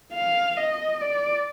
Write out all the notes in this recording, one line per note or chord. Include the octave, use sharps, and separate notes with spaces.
F5
D#5
D5